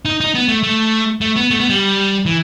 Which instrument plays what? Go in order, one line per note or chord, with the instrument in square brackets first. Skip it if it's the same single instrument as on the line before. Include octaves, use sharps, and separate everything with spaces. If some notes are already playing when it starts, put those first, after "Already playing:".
[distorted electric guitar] D#4
D#4
B3
A3
A3
A3
B3
A3
B3
G3
E3